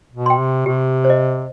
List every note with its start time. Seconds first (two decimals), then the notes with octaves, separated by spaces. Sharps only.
0.13 B2
0.26 G5 C6
0.39 C3
0.66 C3 G4
1.04 C5
1.10 D#5